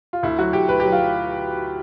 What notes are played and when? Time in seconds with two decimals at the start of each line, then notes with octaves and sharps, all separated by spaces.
0.13 F4
0.23 D2 E4
0.38 F#3 F#4
0.53 D2 G4
0.69 D2 B4
0.80 G4
0.84 F#3
0.92 F4
0.99 F#3